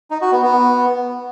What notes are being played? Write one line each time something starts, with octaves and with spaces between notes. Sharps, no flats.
D#4
F#4
B3
B3